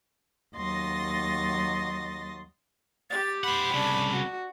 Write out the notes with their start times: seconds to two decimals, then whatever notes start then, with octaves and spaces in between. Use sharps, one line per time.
0.55 D#2 F#3 D#5 C6 A6 A#6
3.10 G4 A6
3.44 C5 F#5 B5
3.74 C2 C#3 D4
4.12 F#4